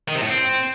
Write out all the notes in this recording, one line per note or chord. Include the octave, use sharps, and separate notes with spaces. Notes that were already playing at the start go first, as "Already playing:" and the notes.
D#3
C3
A2
C4